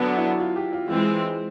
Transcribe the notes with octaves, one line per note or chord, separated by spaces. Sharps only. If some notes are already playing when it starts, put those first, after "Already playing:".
Already playing: D3 F#3 B3 D4 F#4
E4
F4
G4
F4
E3 G#3 C4 F4